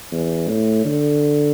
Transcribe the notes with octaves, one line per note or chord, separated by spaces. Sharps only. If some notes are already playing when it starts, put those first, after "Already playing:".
E2
A2
D3